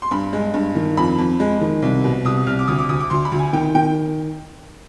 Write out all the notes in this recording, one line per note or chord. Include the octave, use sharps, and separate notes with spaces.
C6
G2 B5
G#3
G2
D#3
F2 B5
F2
G#3
D#3
C2
B2
C2 D#6
C2 F6
D6
D2 D#6
D6
D2 D#6
D6
D2 C6
B5
D2
G#5
D#3 G5
D#3 G5